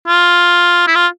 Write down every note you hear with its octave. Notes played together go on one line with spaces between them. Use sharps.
F4
E4
F4